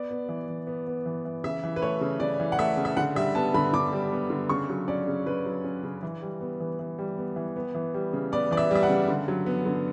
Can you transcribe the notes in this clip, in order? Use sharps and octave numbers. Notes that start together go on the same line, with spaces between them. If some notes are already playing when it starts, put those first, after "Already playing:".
Already playing: B3 D5
B3
E3
E3
B3
B3
E3
E3
C#3 E5
E3
B4
A3 C#5
C#3
C#3 D5
E3
F#5
A3 E5
C#3
E5
D3 F#5
G3 E5
B3 A5
D3 B5
D3 D6
G3
B3
D3
C#3 C#6
F#3
C#4 D5
C#3
C#3 B4
F#3
C#4
C#3
E3
G3
B3
E3
E3
G3
B3
E3
B3
E3
G3
C#3
B3 D5
E3 D5
E5
G3 E5
F#5
C#3
D3
F#3
B3
D3